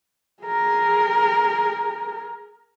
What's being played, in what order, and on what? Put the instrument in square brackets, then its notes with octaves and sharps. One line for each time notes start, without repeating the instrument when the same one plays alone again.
[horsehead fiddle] G#4 A#4